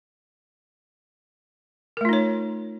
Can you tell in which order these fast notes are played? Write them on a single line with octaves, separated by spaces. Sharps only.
A#4 A3 F4 D#4 C#5